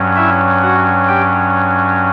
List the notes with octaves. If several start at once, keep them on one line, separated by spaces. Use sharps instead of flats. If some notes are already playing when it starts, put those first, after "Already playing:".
Already playing: G2 F#3 C#4
E4 E5
F#4 F#5
G4 G5